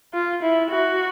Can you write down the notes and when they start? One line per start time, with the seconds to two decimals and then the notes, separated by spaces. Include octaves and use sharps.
0.14 F4
0.42 E4
0.70 F#4